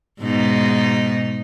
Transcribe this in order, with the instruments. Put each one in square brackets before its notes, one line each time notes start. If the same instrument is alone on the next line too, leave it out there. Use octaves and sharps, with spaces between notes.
[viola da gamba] G#2 B2 D#4